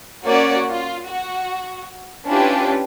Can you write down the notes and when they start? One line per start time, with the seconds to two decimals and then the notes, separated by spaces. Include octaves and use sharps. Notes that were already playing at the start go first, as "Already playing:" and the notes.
0.25 A#3 C#4 F#4 C#5 D5
0.69 F4
1.07 F#4
2.26 C#4 D4 E4 F4 G4 B4